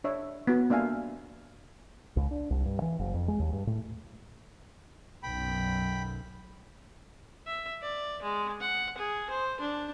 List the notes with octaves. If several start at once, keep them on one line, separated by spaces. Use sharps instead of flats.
D4 C#5 E5
B3 F#4
A#3 D4 E5 F5 G#5
C#2
D4
C2
G2
E3
F#1
F2
G#3
D#2
G2
A2
B1 F#2 G5 B5
E5
D5
G#3
F#5
G#4
C5
D4